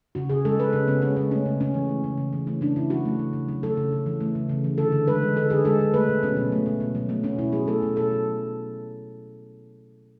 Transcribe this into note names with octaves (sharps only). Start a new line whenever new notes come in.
C#3 F#4
C#3 G#4
G#3 A4
G#3 B4
C#3 C#4
C#3 B3
G#3 C#4
G#3 C#4
A3 C#4
C#3
C#3 C#4
E3
A3
C#3
C#3
E3
A3 C#4
C#3 D4
C#3 E4
F#3 F#4
A3
C#3
C#3
F#3
A3 A4
C#3
C#3
E3
A3
C#3
C#3
E3
D3 A4
D3
G#3 B4
G#3
D3 A4
D3 G#4
G#3 A4
G#3
A3 B4
B2
B2 C#4
F#3
A3
B2
B2
F#3
A3 B3
B2 C#4
B2 E4
F#3 G#4
A3 A4
B2
B2 A4
F#3